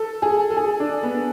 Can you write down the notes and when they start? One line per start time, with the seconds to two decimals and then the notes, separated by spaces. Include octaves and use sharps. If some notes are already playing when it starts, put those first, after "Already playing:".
Already playing: A4
0.22 G#4
0.50 A4
0.57 G#4
0.80 D4
1.03 B3